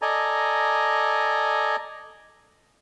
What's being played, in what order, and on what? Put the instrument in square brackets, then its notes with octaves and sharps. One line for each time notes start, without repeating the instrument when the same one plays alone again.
[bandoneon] A4 D5 D#5 G#5 A#5